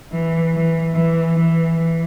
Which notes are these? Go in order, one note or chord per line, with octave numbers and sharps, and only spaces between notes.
E3
E3
E3
E3
E3